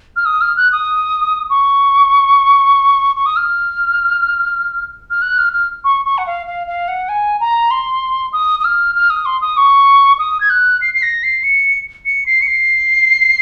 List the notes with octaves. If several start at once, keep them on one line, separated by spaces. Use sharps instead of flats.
F6
D#6
F6
F#6
D#6
C#6
C#6
D#6
F6
F6
F#6
F6
F6
C#6
C#6
F#5
F5
F5
F5
F#5
G#5
A#5
C6
D#6
D#6
F6
F6
D#6
C6
D#6
C#6
D#6
G#6
F#6
C7
C7
A#6
C7
C#7
C#7
C7
C#7
C7